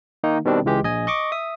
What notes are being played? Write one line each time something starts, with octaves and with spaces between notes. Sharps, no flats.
D#3 A#3 D#4
B2 D#3 G3 C4 D4
C#2 E3 G#3 G4
A#1 D#5 G#5
D#5 C#6 D6
E5 D#6